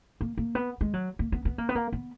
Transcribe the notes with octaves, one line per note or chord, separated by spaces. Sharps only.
A#3
A#3
B3
G#3
F#3
A#3
B3
B3
A#3
B3
A#3
B3